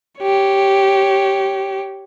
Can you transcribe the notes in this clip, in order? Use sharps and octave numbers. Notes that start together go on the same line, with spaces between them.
G4 C#5